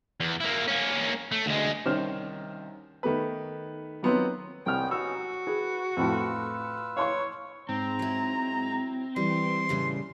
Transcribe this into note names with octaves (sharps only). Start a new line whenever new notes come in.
E2
A#3 E4
A#3 C#4
A3
D2 G#3
C2 D#3 C#4 C5 F6 E7
D#3 A3 B3 B4
D#3 F#3 B3 C4 F4 B4
C2 B3 C#4 D#4 G5 F6
F#4 E6
G#4 B4
F2 A2 F4 B4 E6
C#5 F5 C6 C#6
G#2 C4 A#5
F#3 E4
E3 G3 C6
A2 C#3 G3